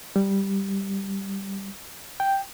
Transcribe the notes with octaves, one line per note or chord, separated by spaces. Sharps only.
G3
G5